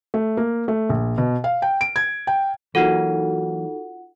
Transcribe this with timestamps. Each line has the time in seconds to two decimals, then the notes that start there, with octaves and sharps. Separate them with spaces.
0.14 A3
0.37 A#3
0.68 A3
0.89 A#1
1.18 B2
1.44 F5
1.62 G5
1.81 D7
1.96 G#6
2.27 G5
2.75 E3 F#3 A#3 D#4 F4 F#4 A4 F#5